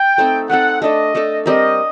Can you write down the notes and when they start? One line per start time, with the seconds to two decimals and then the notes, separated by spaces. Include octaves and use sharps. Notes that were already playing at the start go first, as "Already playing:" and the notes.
Already playing: G5
0.18 A3 C4 D#4 A4
0.50 A3 C4 D#4 A4 F#5
0.82 A3 D4 A4 D#5
1.15 A3 D4 A4
1.46 G3 C4 G4 A#4 D#5